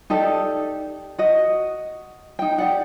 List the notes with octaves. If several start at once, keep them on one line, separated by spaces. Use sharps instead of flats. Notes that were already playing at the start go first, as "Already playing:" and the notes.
D#4 G4 A4 D5
F#4 D#5
D#4 G5
G4 D5 F#5